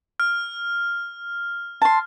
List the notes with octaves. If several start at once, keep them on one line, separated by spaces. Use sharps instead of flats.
F6
A5 C6